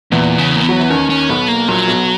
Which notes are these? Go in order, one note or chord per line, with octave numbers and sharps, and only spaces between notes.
E2 A#2 E3
C#3
A#3
B3
F#3
E3
D#2 D#3 C#4
C#4
B1 B2 B3
A#3
A#1 A#2 F#3
B1 B2